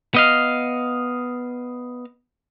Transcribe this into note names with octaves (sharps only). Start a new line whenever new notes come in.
B3 D#5 F5